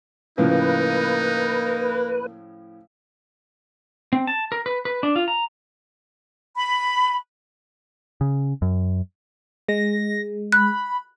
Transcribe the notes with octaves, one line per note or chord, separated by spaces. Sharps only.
A2 C#3 F3 A#3 D#4 B4
C4
A5
A#4
B4
B4
D4
F4
A#5
B5
C#3
F#2
G#3 A#6
B5 F#6